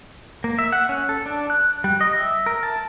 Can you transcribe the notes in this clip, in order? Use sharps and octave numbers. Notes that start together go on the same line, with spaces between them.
A#3
E5
F#5
C#4
A4
D4
F#6
G3
D#5
E5
A#4
A5